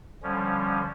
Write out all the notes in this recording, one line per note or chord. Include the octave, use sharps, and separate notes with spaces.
D3 F3 G3 C#4